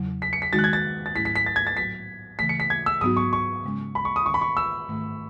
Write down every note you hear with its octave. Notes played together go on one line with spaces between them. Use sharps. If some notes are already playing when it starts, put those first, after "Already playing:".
Already playing: E2 C#3 F#3
B6
C#7
B6
D#3 G#3 D#4 F#4 A6
F#6
G#6
A6
A6
G#2 F#3 A3 C#4 E4 B6
B6
B6
A6
G#6
A6
A2 F#3 B3 D#4 F#4 B6
C#3 E3 A3 B6
C#7
B6
G#6
E6
G#2 F#3 B3 D#4 F#4 D#6
C#6
C#6
C#3 G#3 C#4
B5
C#6
D#6
D#3 G#3 C#4 C#6
B5
C#6
E6
G#2 D#3 A3